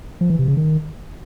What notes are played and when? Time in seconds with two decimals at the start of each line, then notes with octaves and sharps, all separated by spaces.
0.21 F3
0.30 E3
0.39 C3
0.48 C#3
0.57 D#3